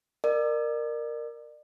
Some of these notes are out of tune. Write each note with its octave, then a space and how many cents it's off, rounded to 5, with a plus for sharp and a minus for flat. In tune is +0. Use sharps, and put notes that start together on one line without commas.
A#4 +0 D5 +35